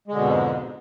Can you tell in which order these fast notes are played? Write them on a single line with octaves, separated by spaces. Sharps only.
G#3 D3 B2 F2 G#2